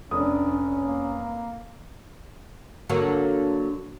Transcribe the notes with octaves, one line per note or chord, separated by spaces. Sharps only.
F1 C#4 D4 D#6
A#3
D3 F#3 A#3